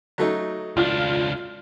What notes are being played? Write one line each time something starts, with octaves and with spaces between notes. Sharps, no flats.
F#3 A3 D#4
C#2 D4 F4 F6